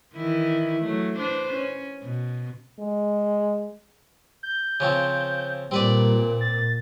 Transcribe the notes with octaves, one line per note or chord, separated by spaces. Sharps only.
D#3 E3 E4
F#3 A3
D4 B4 C5
C#4
B2
G#3
G6
C#3 F3 C4
A#2 G3 C4 B4 D5
A6